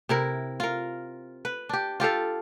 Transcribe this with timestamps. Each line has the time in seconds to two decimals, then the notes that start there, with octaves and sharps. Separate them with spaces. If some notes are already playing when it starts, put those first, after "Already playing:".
0.09 C3 E4 A#4
0.60 F4 A#4
1.45 B4
1.69 D4 G4
2.00 F4 G4 A4 F5